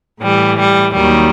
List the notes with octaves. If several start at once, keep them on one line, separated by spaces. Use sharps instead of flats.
A2 E3 G3
G3
D#2 D#3 F#3 G3